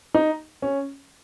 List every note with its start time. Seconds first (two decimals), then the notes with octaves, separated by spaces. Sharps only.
0.14 D#4
0.62 C#4